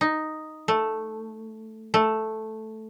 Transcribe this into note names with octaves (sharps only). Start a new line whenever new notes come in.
D#4
A3
A3